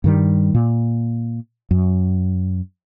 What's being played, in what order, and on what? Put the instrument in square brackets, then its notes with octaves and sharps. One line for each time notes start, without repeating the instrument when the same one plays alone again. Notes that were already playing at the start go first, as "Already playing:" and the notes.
[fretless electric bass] G2 D#3 G3
A#2
F#2